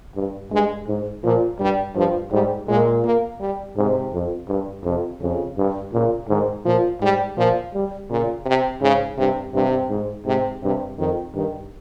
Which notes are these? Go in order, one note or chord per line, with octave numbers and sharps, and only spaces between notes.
G2
G2 G#3
G#2
A#2 F3
G2 G3
G2 F3
G#2 G3
A#2 G#3
A#3
G3
G#2 C3
F2
G2
F2 C3
F2 C#3
G2
A#2 C#3
G#2 D#3
A#2 F3
G#2 G3
A#2 F3
G3
A#2 C#3
C3
G#2 C#3
G2 C3
G2 C3
G#2
G#2 C3
G2 C3
F2 D#3
G2 D#3